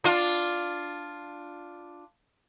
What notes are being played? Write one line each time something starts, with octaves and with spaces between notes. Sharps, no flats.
D4 F4